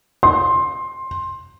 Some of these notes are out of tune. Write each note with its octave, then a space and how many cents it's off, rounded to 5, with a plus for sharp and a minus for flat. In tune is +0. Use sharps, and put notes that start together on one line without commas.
C6 +15